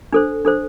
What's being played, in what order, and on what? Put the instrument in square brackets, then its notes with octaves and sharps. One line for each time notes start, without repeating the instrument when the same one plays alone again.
[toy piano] D4 A4 C5
D4 A4 C5